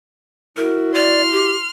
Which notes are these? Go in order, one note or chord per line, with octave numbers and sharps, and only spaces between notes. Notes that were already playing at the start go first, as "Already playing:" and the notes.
E4 F#4 A#4
D5 C6 F6
G4